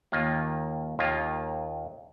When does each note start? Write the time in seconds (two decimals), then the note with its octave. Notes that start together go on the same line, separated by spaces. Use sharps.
0.12 D#2 D#3 A#3 F4
0.99 D#2 D#3 A#3 F4